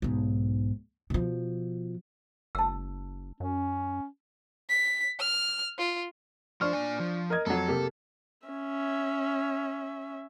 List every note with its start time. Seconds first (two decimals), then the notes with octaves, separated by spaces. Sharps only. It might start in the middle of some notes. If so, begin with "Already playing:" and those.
0.02 B1 G#2
1.10 B2 F3
2.55 F#1 A5 E6
3.40 F#2 C#4
4.69 B6
5.20 F6
5.78 F4
6.61 F3 D4 C5 C#6 F6
6.73 A#2 G#5
7.00 F3
7.30 A#4 D#5 G#6
7.46 F2 F#3 A4
7.68 C3 A#3 G4
8.47 C#4 E5